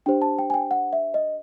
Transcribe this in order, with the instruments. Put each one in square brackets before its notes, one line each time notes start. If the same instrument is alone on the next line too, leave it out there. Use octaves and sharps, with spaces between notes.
[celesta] D4 G4 C5 G5
A5
G5
G#5
G5
F#5
E5
D#5